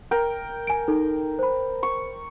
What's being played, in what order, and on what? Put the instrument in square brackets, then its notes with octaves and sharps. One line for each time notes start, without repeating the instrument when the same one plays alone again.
[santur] A#4 G5
[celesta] G#5 D7
D#4 A4
C5 B5
[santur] C#6